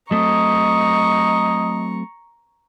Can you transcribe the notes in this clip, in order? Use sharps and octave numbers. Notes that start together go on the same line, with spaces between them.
F#3 A3 C4 D#5 A#5 C#6